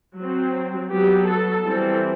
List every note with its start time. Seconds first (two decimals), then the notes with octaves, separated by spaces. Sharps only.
0.18 F#3 C4
0.91 F#3 B3 G4
1.28 A4
1.64 E3 G3 C4